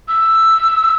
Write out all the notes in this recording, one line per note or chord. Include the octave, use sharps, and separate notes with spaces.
E6